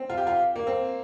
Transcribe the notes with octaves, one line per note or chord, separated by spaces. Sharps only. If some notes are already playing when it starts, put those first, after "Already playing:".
Already playing: C4
F4
G4
F4
A#3
C4